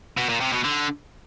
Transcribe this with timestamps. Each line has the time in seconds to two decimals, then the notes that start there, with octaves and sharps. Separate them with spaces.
0.17 B2
0.29 A#2
0.41 C3
0.53 B2
0.65 D3